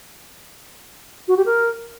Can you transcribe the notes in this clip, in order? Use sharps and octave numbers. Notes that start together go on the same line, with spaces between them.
F#4
G4
A#4